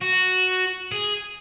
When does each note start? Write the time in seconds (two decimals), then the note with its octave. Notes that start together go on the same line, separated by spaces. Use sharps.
0.01 F#4
0.92 G#4